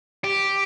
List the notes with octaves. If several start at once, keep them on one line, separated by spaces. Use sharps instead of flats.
G4